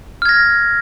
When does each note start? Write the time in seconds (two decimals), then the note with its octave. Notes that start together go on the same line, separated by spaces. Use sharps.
0.22 F6
0.25 G#6
0.29 A#6